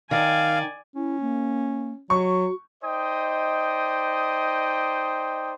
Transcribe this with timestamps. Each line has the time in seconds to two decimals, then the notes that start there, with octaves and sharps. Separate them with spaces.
0.11 D#3 D5 F5 G#5
0.96 C#4 E4
1.21 A#3
2.10 F#3 F#4 C#6
2.83 D#4 C5 D5 D#5 G5 D#6